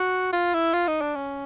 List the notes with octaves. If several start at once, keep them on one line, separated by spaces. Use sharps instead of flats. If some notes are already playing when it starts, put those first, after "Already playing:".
Already playing: F#4
F4
E4
F4
D#4
D4
C#4